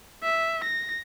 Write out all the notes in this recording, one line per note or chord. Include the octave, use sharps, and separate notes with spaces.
E5
A#6